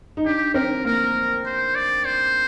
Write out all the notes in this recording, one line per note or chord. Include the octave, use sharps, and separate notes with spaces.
D#4
D4 G4
C4 A#4
A#3 A#4
C5
D5
C5